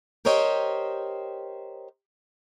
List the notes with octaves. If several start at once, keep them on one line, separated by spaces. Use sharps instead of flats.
G4 A#4 C5 C#5 D#5 G5